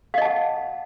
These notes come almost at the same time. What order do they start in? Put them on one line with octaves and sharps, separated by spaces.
F5 D#5 A5 F#5